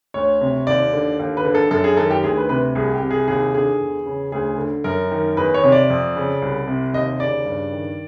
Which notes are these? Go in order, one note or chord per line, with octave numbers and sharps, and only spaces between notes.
D2 C#5
C3
D#2 D5
D3
D#2
B4
D3
A4
F#2 A4
G#4
D#3 A4
G4
D2 G#4
B4
C3 B4
C2 G#4
G4
C3
G#4
D#2 G#4
D3 G#4
E2
C#3
D2 G#4
D3
F#2 A#4
D#3
E2 B4
C#5
C3
D5
F2
C#3
C2
C3
D#2 D#5
C#3 D5
G2
D#3